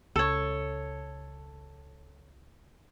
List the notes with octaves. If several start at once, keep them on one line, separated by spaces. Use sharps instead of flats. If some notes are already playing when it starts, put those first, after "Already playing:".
C#2 A4 C#5